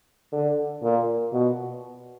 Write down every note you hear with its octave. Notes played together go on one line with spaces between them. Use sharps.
D3
A#2
B2